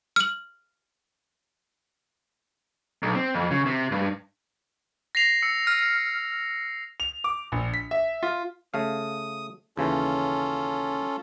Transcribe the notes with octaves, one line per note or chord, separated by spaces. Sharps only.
F6 F#7
B1
C4
F2
C#3
C3
G2
A#6 C7 F7
E6 C#7
F6
F7
D6
A#1
B6
E5
F4
C#3 A3 F5 D#6
D#2 C#3 E3 C#4 F4 A4